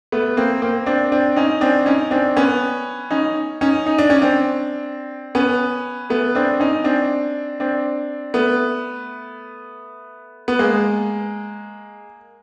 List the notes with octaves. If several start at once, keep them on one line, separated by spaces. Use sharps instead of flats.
A3 B3
A#3 C4
A#3 C4
C4 D4
C4 D4
C#4 D#4
C4 D4
C#4 D#4
C4 D4
B3 C#4
C#4 D#4
C#4 D#4
D#4
D4
C#4
C4 D4
B3 C#4
A3 B3
C4 D4
C#4 D#4
C4 D4
C4 D4
A3 B3
B3
G#3 A#3